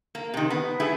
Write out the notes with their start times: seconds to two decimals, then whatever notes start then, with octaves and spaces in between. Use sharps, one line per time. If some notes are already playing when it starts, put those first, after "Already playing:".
0.15 A#3
0.34 C3 D#3
0.50 B3
0.80 A3 E4 G#4